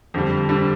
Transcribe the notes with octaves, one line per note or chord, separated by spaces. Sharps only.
F2 D3 G3
D3 G3